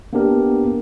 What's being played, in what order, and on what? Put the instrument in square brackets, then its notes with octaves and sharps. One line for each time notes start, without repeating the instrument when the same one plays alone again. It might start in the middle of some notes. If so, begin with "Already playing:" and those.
[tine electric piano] A#3 B3 D4 G4 A#4